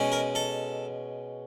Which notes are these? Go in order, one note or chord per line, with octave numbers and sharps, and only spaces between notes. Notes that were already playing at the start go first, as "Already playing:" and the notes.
Already playing: B2 G#3 C#4
A#4
A4